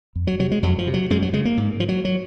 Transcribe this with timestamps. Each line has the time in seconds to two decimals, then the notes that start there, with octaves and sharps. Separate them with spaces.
0.16 F2
0.27 F#3
0.39 C3 F#3
0.51 G#3
0.63 F2 F#3
0.79 F3
0.87 C3
0.94 F#3
1.10 F#2 G#3
1.22 F#3
1.33 C#3 G#3
1.45 A#3
1.57 G#2
1.80 F3
1.89 F#3
2.05 F#3